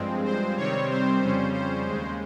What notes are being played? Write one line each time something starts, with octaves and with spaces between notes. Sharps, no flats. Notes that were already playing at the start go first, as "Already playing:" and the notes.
Already playing: G2 F3 G#3 C4
C5
C3 D#3 G3 C4 C#5
C5
F2 C#3 G3 C#4
C5
D#2 C#3 G#3